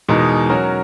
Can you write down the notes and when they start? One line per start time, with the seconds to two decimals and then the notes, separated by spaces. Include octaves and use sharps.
0.08 E2 B2 G#3 D#4 A#4
0.50 F#3 C#4 F#4 A#4